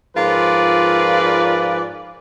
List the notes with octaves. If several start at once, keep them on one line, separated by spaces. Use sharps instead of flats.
G#2 F3 F4 A#4 B4 D5